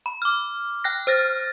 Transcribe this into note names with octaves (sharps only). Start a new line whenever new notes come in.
B5
D6 F6
G5 F#6 A#6
C5 F6 A6 A#6